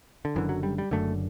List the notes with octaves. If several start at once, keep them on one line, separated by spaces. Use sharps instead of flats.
D3
F#1 F#2 D3 E3
F#3
G3
G3
F#1 F#2 D3 A3